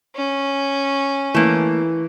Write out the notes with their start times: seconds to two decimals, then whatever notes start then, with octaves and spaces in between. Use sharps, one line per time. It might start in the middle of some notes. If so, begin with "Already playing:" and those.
0.16 C#4
1.34 E3 A3 A#3